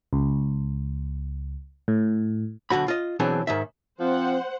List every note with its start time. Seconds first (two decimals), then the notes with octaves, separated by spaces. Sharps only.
0.13 C#2
1.88 A2
2.70 B1 F#2 D3 F#4 B5
2.88 F4 D#5
3.20 B2 E3 F#3 C4 D4 G#4
3.47 G#2 D#3 E5
4.00 F3 C4 C5 F#5